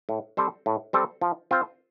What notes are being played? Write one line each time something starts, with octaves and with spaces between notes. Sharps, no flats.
A2
G3 C4 A4 C5
A2
G3 C4 A4 C5
F3
C4 F4 C5